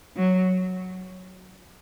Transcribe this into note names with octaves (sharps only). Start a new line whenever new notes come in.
F#3